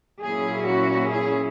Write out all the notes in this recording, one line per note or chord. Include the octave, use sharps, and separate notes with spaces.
A#2 F#3 A#3 C#4 E4 G#4
F#4
G#4